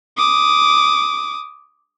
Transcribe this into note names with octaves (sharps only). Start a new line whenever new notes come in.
D6 D#6